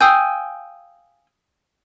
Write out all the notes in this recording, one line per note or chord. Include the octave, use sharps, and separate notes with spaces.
F5 G5 G#5 D#6 E6 G6